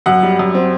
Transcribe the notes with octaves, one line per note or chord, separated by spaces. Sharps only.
F#2 F#5
G3
F#2
C4